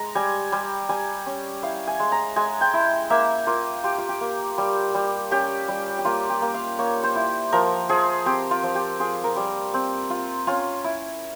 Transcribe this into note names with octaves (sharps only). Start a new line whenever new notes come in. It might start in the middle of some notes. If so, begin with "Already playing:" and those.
Already playing: G#3 A#5
G3 G#5
G3
G3 G#5
C#4
E4 F5
G#5
G#3
A#5
G#3 G#5
G5
E4
A#3 E5
A#3 F4
F4 G4
F4
G4
A#3
G3
G3
C#4 G4
G3
G4
A#3 F4
G4
A#3
F5
A#3 C#5
C5
E4
F3 A#4
F3 G#4
C4 G4
F4
F3
G4
F4 G#4
A#4
G3
C4
F4
C#4 F4
E4